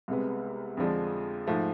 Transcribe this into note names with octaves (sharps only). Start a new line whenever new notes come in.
C2 C3 G#3 B3
F2 D3 F3 G#3 D4
G#2 F3 A3